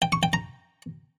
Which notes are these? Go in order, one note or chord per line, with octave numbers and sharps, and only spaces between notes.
G5
C#6
G5
A#5